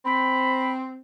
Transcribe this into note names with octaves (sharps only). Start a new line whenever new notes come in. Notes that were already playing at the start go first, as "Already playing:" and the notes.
C4 B5